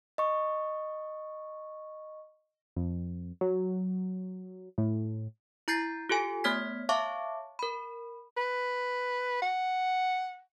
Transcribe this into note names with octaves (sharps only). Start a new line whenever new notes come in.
D#5 C#6
F2
F#3
A2
E4 A#5 G6 A6 C7
F4 G4 A4 G#5
A3 B3 C#5 F6 G#6 B6
C#5 E5 F5 A5 C#6 D6
A#4 B5
B4
F#5